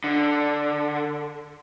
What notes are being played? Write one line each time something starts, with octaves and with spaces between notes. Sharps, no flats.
D3